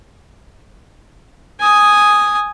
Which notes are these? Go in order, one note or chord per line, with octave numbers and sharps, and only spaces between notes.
G#5 D#6